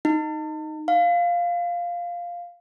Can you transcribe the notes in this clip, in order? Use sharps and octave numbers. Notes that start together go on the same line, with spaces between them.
D#4
F5